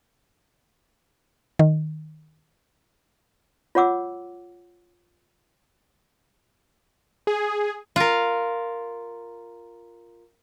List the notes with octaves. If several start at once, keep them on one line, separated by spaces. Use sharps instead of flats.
D#3
F4 C#5 F#5 D6 E6
G#4
F4 A#4